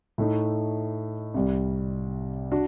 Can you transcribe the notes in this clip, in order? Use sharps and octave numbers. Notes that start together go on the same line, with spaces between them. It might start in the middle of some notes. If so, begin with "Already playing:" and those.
A2 A3 D#4
C2 C3 G3
D4 F#4